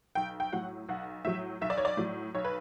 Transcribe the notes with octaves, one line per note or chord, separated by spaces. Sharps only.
B1 G5
G5
A2 F#3 F#5
B1 F#5
A2 F#3 E5
B1 E5
D5
C#5
D5
A2 F#3
B1 C#5
B4